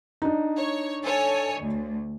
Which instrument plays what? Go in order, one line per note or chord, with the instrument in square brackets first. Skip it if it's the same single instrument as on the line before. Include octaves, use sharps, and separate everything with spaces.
[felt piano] D4 D#4
[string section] C#5
A4 C#5 G#5
D2